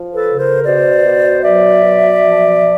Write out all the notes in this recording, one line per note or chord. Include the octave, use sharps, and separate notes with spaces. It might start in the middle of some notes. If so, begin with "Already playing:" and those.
Already playing: F3
A4 B4
C#3
A#4 C5
B2 C5 D5
B2
F#3 D5 E5
B2
F3
F3